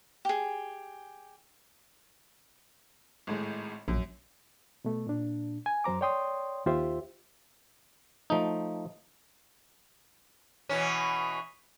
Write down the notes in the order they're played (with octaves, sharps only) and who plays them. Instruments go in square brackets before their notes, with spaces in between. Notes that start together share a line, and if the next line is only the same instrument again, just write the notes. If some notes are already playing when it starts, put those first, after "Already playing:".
[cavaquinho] G4 G#4
[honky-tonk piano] G#1 A2 G#3
[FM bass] A#1 [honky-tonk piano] F#2
[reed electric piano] B2 A3
A#2 D4
G#5
F#2 F#3 C5 A#5 D6
C#5 D5 G5 C6 D#6
D#2 F4 G4 C5 E5
[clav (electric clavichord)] F3 A3 D#4
[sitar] B2 E3 C#4